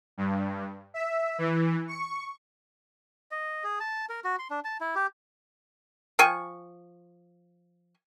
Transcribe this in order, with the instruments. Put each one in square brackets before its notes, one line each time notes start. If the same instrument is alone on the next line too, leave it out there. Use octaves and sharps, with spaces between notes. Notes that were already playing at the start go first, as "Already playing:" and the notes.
[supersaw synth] G2
E5
E3
C#6
[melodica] D#5
G#4
A5
A#4
F#4
C6
D4
A5
E4
G4
[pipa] F3 G5 G#5 C#6